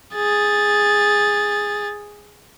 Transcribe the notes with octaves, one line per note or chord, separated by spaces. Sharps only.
G#4 A6